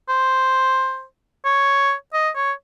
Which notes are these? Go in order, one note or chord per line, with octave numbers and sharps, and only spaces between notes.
C5
C#5
D#5
C#5